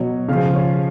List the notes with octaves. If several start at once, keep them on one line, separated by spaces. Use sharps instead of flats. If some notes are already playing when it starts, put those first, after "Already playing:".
Already playing: B2 F#3 C#5
C#3 F3 F5
C#5